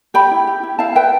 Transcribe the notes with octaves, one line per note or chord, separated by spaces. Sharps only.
G4 G5 B5
E4
G4
E4
E4 F5 A5
B4 E5 G5